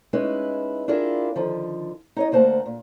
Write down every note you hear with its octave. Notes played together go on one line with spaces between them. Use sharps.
G#3 C#4 D#4 E4 B4
D4 E4 F4 G4 G#4 A#4
D3 D#3 F3
D#4 C#5 D#5
D2 A#3 C5 F#5 A5 A#5
A#2